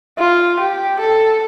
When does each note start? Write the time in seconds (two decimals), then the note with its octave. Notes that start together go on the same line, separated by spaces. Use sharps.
0.19 F4
0.60 G4
0.99 A4